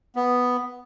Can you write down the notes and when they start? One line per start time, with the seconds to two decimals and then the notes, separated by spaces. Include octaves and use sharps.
0.16 B3